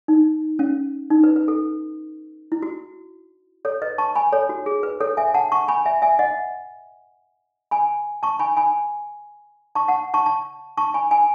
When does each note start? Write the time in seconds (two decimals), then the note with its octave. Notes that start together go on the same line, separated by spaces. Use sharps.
0.08 D#4
0.59 C#4
1.10 D#4
1.24 B4
1.36 B4
1.48 A4
2.52 E4
2.62 F#4
3.65 A4 C#5
3.82 B4 D#5
3.98 A5 C#6
4.15 G#5 B5
4.33 A4 C#5
4.49 F#4
4.66 G#4
4.83 B4
5.00 A4 C#5
5.17 E5 G#5
5.34 F#5 A5
5.52 A5 C#6
5.68 G#5 B5
5.85 E5 G#5
6.02 E5 G#5
6.19 D#5 F#5
7.71 G#5 B5
8.23 A5 C#6
8.39 G#5 B5
8.57 G#5 B5
9.75 A5 C#6
9.88 F#5 A5
10.14 A5 C#6
10.26 A5 C#6
10.78 A5 C#6
10.94 G#5 B5
11.11 G#5 B5